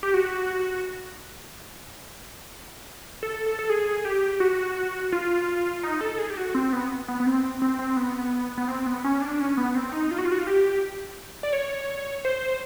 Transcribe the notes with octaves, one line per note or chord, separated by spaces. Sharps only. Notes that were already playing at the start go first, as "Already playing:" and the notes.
G4
F#4
A4
A4
A4
G#4
G4
F#4
F4
D#4
A4
G#4
G4
F#4
C4
B3
B3
B3
C4
C4
C4
B3
B3
C4
B3
C#4
D4
C#4
B3
C4
D#4
F4
F#4
F4
F#4
F4
G4
D5
C#5
C5